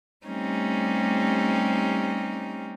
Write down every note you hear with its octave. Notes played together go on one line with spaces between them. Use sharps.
G3 A3 C4 C#4 D#4 G4